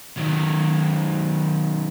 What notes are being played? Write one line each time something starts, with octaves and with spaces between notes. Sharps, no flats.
D#3 F#3